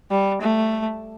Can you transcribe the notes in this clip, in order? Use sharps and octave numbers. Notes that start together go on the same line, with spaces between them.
G3
A3